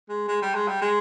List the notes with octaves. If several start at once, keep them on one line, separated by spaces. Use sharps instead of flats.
G#3
G#3
G3
G#3
G3
G#3